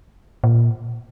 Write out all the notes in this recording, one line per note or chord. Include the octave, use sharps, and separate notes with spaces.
A#2